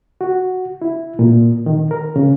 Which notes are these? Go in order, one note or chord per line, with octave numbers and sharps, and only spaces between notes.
F#4
E4
A#2
D#3
A#4
C#3